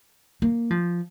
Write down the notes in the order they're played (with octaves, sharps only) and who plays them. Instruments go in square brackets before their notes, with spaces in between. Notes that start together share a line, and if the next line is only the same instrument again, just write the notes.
[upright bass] A#3
F3